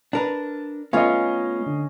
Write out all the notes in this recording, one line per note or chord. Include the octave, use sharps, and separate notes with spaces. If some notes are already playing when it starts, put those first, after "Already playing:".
D4 A#4 B4 A5
A3 B3 C#4 F4 D#5 F5
D3